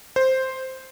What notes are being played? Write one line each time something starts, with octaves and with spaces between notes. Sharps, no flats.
C5